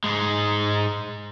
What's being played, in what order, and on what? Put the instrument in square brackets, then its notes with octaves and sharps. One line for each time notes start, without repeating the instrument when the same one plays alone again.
[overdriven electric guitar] G#2 G#3